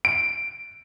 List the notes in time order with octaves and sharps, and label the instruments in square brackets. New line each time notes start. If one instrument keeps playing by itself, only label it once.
[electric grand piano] D7